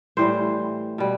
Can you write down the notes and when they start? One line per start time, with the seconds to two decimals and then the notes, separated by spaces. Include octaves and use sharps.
0.17 A2 E3 G3 C5
0.98 B2 G3